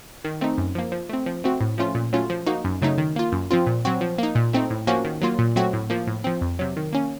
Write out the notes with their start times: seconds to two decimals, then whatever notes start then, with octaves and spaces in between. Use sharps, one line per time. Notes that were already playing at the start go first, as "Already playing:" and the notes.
0.24 D#3
0.41 A3 C4 D#4
0.58 F#2
0.75 F3 A#3
0.92 F3
1.09 A3 C4
1.26 F3
1.44 A3 C4 F#4
1.61 A2
1.78 F3 A3 C#4 F4
1.95 A#2
2.13 F#3 A3 C#4 F4
2.30 F3
2.47 A#3 D#4 F#4
2.64 F#2
2.82 C#3 F#3 A3 D#4
2.98 D#3
3.16 A#3 F4
3.32 F#2
3.51 F3 C4 F4
3.67 A#2
3.85 F#3 C4 F#4
4.01 F3
4.18 A#3 D#4
4.35 A#2
4.53 A3 C4 D#4
4.70 A2
4.87 F3 A#3 C#4 F#4
5.05 D#3
5.22 F#3 A#3 F4
5.39 A#2
5.56 F#3 A3 C4 F#4
5.73 A2
5.90 F3 A#3
6.07 A2
6.24 F3 C4
6.41 F2
6.59 C3 F#3
6.77 D#3
6.93 A#3 C#4